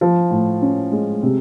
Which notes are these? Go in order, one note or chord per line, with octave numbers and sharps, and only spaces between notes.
F3
A2
C#4
G#3
C3